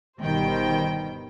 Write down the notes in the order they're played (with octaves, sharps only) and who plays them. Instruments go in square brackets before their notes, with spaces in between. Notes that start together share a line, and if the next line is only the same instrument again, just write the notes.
[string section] G1 B2 D#3 G3 C5 G5